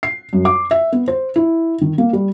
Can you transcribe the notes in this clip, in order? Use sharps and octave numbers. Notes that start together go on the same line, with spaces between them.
C7
F#2
D6
E5
B3
C5
E4
D#3
A#3
G3